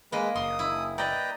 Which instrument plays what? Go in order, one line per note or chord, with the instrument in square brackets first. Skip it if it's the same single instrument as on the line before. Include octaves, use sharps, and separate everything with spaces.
[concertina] G#3 B4 [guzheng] A#3 D#5
[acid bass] F#1 [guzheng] C6 [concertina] D#6
[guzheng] E4
[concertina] B4 G5 A#5 [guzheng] D5 D#5